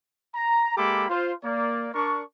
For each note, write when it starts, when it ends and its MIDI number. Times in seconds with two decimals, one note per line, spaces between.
0.35 0.76 82
0.77 1.07 56
0.77 1.07 58
0.77 1.07 67
0.77 1.07 69
0.77 1.07 83
0.77 1.07 86
1.10 1.33 65
1.10 1.33 72
1.44 1.89 58
1.44 1.89 74
1.94 2.23 62
1.94 2.23 70
1.94 2.23 85